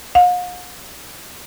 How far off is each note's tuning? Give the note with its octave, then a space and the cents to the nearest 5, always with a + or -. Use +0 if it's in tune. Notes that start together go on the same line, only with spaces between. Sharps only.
F5 +45